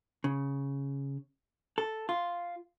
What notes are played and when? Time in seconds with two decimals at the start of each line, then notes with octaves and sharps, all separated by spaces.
0.24 C#3
1.78 A4
2.09 F4